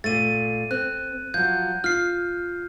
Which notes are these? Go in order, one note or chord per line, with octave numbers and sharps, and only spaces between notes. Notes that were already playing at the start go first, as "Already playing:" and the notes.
A#2 A3 A6 D#7
C4 F#6
F3 F#3 G6
F4 F6 C7